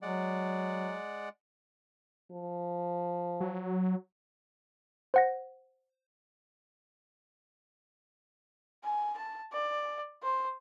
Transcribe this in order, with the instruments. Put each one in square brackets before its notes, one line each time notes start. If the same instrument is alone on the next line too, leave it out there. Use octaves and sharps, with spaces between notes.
[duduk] F#3 [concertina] G#3 D5 F#5
[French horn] F3
[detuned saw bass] F#3
[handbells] C5 F#5 A#6
[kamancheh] G#5
A5
D5
C5